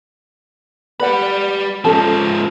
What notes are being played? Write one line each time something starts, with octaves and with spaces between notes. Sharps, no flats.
G4 B4 D5 F#5 B5
G#2 F3 C#4 A4 A5